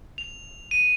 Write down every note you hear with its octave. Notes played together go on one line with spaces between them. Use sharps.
F7
D#7